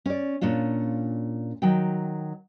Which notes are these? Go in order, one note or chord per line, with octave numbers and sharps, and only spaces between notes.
C#4 D5
A#2 C#4 D4 F4
D#3 F#3 G5